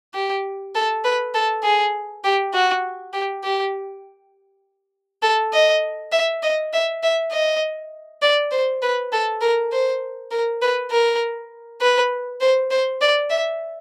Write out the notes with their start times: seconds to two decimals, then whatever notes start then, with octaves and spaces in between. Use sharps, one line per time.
0.14 G4
0.75 A4
1.04 B4
1.34 A4
1.63 G#4
2.24 G4
2.54 F#4
3.13 G4
3.43 G4
5.22 A4
5.53 D#5
6.12 E5
6.43 D#5
6.73 E5
7.03 E5
7.32 D#5
8.22 D5
8.51 C5
8.82 B4
9.12 A4
9.41 A#4
9.72 C5
10.31 A#4
10.61 B4
10.91 A#4
11.81 B4
12.41 C5
12.71 C5
13.01 D5
13.30 E5